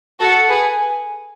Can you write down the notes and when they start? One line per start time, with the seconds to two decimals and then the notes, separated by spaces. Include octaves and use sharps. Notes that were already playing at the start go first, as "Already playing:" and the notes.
0.19 F#4 A4 F#5
0.49 G#4 B4
0.64 G#5